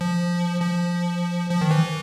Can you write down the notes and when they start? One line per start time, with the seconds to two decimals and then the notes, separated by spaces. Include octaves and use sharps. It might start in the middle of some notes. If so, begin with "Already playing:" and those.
0.01 F3
0.61 F3
1.51 F3
1.61 D#3
1.71 E3